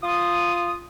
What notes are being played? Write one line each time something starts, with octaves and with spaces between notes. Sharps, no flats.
F4 D#6